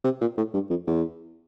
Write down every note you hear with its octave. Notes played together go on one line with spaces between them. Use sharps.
C3
A#2
A2
G2
F2
E2